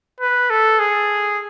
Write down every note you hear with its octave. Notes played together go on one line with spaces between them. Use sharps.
B4
A4
G#4